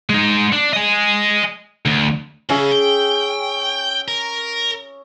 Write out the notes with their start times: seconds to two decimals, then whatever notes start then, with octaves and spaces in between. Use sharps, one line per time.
0.10 G#3 D#4
0.52 D4
0.73 D#5 G#5
1.86 D2
2.49 C#3 C#4 G#4 E5
2.72 G5
4.08 A#4